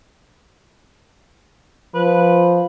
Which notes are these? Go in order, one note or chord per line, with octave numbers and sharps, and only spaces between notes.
F3 B4